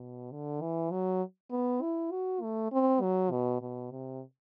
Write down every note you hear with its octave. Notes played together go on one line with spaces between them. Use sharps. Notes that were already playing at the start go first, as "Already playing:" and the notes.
Already playing: B2
D3
E3
F#3
B3
E4
F#4
A3
C4
F#3
B2
B2
C3